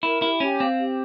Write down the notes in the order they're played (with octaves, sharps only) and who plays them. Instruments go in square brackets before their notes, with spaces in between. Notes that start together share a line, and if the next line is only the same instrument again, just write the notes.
[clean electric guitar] E4 [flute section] A#4
[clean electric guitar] E4 [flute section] G4
[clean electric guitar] C#4 [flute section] G4
[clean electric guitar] C4 [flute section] F5
[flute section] G4